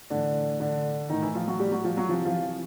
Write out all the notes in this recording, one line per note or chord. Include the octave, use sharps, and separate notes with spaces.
A2 D3 E3 D4
D3 D4
A2 D#3 E3 D#4
E3 E4
F3 F4
F#3 F#4
G3 G4
F#3 F#4
F3 F4
F#3 F#4
C3 E3 F3 F4
F3 F4